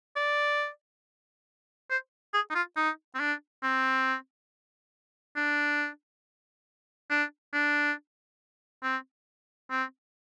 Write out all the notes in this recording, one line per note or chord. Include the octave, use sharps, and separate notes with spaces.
D5
C5
G#4
D#4
F4
D#4
C4
D4
C4
D4
D4
D4
C4
C4